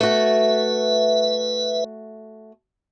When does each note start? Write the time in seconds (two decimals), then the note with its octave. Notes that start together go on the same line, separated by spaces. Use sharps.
0.01 A3 F#4 B4 E5